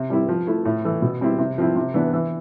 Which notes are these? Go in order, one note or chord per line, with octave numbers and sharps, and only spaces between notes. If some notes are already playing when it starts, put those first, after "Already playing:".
Already playing: C3
G3 C4 E4
F3
A3 E4
A2
E3 A3
B2
G3 C4 E4
C3
F3 C4 E4
C3
E3 B3 D4
E3